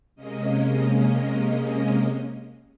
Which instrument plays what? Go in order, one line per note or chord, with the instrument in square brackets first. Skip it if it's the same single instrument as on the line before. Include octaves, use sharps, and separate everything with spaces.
[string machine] C3 G#3 A#3 C#4 D#5